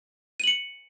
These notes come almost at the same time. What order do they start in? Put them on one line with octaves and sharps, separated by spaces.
D#7 F#7 C#7